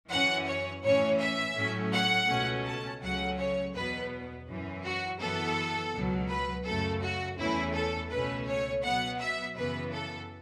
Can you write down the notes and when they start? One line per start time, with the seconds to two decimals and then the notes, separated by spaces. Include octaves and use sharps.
0.10 F#2 E3 C#4 F#5
0.47 C#5
0.83 A2 E3 C#4 C#5
1.20 E5
1.56 A2 F#3 A3 C#4
1.92 F#5
2.29 C#2 B2 A3 C#4
2.66 A5
3.01 C#2 C#3 F#3 A3 C#4 F#5
3.38 C#5
3.74 E2 B2 B3 B4
4.48 F#2 E3 C#4
4.84 F#4
5.20 F#2 E3 B3 A4
5.93 C#2 B2 F#3
6.30 B4
6.66 F#2 C#3 A3 A4
7.03 F#4
7.39 E2 E3 A3 C#4 E4
7.75 A4
8.12 C#2 B2 A3 C#4 B4
8.48 C#5
8.84 B2 F#3 B3 F#5
9.21 E5
9.57 F#2 C#3 E3 B3 B4
9.93 A4